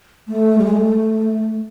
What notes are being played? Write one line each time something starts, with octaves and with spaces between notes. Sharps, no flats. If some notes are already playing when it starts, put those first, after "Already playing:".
A3
G3
G#3
A3